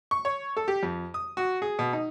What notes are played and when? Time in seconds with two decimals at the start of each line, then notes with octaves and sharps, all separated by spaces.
0.11 C#6
0.25 C#5
0.57 A4
0.68 G4
0.83 F2
1.14 D#6
1.37 F#4
1.62 G#4
1.79 B2
1.93 D#4